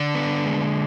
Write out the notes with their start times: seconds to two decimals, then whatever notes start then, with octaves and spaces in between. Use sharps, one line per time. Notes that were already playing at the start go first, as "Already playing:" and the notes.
Already playing: D3 D4
0.15 B3
0.45 G#3